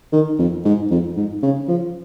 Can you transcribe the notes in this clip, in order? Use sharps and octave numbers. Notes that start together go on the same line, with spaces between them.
D#3
F2
G#2
F2
G#2
C#3
F3